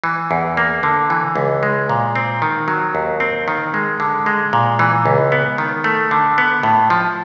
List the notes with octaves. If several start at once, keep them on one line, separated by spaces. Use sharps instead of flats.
E3
E2
A#3
D3
E3
C#2
G#3
A#2
C4
D#3
F#3
D#2
C4
D#3
G#3
D3
G#3
A#2
E3
C#2
B3
D#3
A3
D3
B3
A2
F3